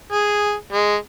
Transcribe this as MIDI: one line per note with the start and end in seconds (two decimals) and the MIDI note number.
0.12 0.53 68
0.73 0.95 56